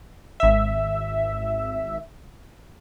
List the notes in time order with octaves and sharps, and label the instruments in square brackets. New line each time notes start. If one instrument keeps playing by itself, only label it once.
[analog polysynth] G#1 E5